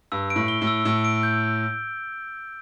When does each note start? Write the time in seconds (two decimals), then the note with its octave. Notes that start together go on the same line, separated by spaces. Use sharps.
0.12 G2 E6
0.30 D7
0.36 A2
0.48 G7
0.62 A2
0.67 E6
0.85 A2 E6
1.05 D7
1.23 G6